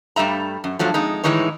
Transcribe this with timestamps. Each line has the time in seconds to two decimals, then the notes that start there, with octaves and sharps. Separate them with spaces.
0.16 G2 G3 A3 E5 A#5
0.64 F#2
0.79 G2 F3 F#3 A3
0.94 F2 G#3 D#4
1.24 A2 D#3 E3 G#3 D#4 C#5